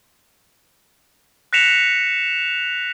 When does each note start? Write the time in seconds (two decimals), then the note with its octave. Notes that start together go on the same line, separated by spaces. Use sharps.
1.53 F#6 A#6 B6 C#7 E7 F7